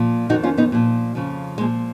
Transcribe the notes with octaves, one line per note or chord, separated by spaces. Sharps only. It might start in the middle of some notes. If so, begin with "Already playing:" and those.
Already playing: A#2 F3
F2 D#3 D#4 F#4
C#4 F4
B3 D#4
A#2 F3
F2 C#3 F3
A#2 F3 G#3